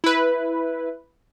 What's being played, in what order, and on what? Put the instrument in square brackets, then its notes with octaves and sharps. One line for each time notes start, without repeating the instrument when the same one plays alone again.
[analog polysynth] E4 B4